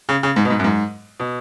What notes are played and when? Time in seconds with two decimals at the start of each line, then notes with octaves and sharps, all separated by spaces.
0.09 C#3
0.23 C#3
0.36 G#2
0.45 B2
0.50 G#2
0.59 F#2
0.64 G#2
1.20 B2